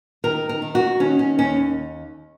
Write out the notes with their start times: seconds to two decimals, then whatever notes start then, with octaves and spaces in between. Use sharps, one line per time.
0.24 D#3 A#4
0.49 A#4
0.62 D#3
0.75 F#4
1.00 D#3 C#4
1.19 C#4
1.39 D#2 C#4